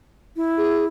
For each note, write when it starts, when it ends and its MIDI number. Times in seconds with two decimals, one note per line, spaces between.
0.36 0.87 64
0.57 0.85 68